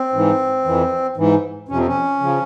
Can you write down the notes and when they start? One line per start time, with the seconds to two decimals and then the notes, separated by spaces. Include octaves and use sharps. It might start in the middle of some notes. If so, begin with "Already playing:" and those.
Already playing: C4
0.13 G#2 E3
0.65 F2 E3
1.17 G#2 E3
1.69 F2 C3 F3 C#4
1.78 C4
1.87 C#4
2.20 C#3 F3